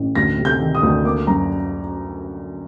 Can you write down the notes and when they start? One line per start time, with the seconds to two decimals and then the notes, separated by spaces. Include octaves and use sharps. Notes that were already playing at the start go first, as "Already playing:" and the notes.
Already playing: A1
0.15 D2 A#6
0.38 C3
0.45 G6
0.60 D#3
0.75 D#6
0.83 D2
1.05 A#3 D6
1.27 F#2 A#5